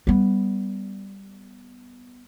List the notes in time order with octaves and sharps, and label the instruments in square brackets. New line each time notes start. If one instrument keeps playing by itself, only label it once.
[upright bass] G3 B3